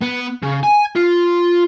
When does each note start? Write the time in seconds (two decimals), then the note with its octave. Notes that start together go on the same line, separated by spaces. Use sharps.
0.02 B3
0.43 C#3
0.63 G#5
0.96 F4